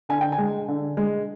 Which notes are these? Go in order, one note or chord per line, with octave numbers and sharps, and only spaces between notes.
D3 G#5
G5
G#5
G#3
D3
G#3